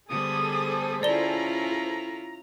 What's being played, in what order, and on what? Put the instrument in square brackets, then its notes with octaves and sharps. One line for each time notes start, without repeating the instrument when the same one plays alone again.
[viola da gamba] D3 G3 B3 [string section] G#4 A4 C5 [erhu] D#6
[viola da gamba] C#4 E4 F4 [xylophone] D5 G7 [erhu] A#5